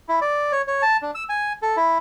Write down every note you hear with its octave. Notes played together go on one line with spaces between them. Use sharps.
E4
D5
C#5
C#5
A5
D4
E6
G#5
A4
E4